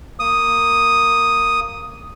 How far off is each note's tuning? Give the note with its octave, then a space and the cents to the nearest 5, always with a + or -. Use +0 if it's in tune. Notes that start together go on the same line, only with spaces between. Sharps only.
A#3 -10 D#6 +0